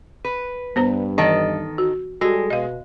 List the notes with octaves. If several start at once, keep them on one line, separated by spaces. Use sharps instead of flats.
B4
G2 B3 C5 A#5
D#3 E3 A4 D#5
F#4
G3 G#3 F#4 G#4 A4
B2 D#5 F5